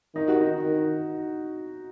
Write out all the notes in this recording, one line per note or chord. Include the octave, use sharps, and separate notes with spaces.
D#3 D#4
F#4
D#4
D#3